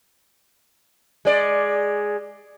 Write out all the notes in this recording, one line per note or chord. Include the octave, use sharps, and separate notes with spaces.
G#3 D5